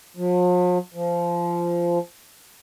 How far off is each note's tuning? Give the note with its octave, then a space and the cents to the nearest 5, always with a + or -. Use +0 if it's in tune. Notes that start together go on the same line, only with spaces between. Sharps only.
F3 +45
F3 -15